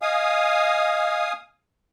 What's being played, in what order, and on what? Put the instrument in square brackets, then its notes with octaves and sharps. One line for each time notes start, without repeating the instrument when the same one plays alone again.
[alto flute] D#5 [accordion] F5 G#5 D#6